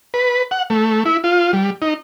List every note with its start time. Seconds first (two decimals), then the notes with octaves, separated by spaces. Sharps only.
0.14 B4
0.51 F#5
0.70 A3
1.05 E4
1.24 F4
1.53 G3
1.82 D#4